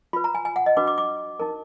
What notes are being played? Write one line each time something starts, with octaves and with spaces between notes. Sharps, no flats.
F4 B4 B5
A#5
G#5
G#5
F#5
D#5
D4 F#4 B4 D6
D6
D6
D#4 A#4